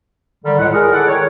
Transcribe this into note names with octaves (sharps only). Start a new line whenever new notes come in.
D3 D#3 G3
C#2 A2 G#3 F#5
G#4 A#4
E4 A4 D5 F#5
D#3 C#5